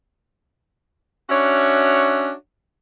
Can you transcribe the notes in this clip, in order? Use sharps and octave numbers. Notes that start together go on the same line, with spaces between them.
C#4 D4 F#4 C#5 E5